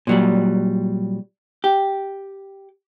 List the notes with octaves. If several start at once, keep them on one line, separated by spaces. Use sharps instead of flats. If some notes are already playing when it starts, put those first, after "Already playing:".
A#2 F#3 G3
G4